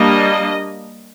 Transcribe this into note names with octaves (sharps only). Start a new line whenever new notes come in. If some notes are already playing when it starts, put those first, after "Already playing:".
Already playing: G3 A#3 D4 D#5